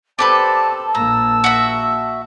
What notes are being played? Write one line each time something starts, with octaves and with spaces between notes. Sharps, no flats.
C4 G4 A4 B4 D5 A5
A#1 A#3 A#5 E6
F#4 E5